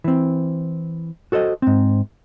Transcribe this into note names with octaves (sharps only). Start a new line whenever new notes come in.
E3 C4
F#4 A4 C5 D#5
G#2 C4